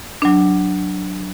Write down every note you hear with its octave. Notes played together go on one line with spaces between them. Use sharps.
F#3 D4